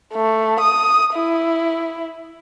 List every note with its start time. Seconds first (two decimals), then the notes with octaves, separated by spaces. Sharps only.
0.14 A3
0.60 D#6
1.14 E4